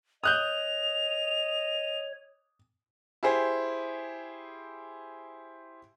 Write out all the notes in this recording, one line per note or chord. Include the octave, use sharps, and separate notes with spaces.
C#5 D#5 D#6 F#6 G6 F7
E4 G4 G#4 C5